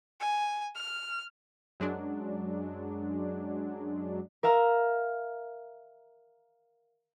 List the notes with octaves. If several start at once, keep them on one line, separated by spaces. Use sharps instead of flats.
G#5
F6
F#2 F#3 G#3 D4
A#4 E5 F5 A#5